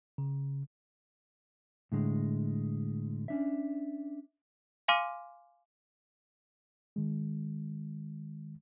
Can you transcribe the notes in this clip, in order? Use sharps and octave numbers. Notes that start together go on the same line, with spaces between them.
C#3
A2 D3 G#3
C#4 D4 E5
F5 G#5 C6 D6 F6 D#7
D#3 G#3